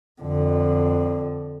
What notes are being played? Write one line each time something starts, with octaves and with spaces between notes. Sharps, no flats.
F2 D3